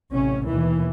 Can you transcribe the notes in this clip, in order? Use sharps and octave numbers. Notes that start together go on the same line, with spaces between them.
A1 C3 C#4
D#2 B2 E3